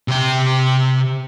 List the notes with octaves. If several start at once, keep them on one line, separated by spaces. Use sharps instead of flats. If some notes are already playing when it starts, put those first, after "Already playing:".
C3 G5